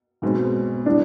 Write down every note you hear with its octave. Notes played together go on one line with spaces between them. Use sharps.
B1 B2 G#3 C4
A2 E3 G3 B3 D4